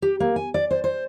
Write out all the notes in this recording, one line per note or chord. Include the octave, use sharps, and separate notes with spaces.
G4
A#3
G#5
D5
C5
C5